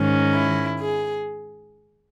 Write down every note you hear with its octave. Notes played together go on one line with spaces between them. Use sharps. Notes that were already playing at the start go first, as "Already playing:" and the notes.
Already playing: G#2 D#3 G#3 C#4
E4
G#4